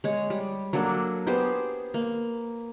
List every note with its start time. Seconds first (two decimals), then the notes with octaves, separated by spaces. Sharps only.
0.04 G#3 C#5
0.30 G3
0.73 F#3 A#3 D4 A4
1.27 B3 G4 G#4 C5
1.94 A#3